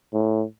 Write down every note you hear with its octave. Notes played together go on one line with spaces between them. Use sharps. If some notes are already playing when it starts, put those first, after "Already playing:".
A2